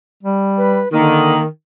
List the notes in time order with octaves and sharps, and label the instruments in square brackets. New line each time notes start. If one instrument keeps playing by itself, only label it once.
[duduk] G3
[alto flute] B4
[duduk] D3 [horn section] D#3 [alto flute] A#3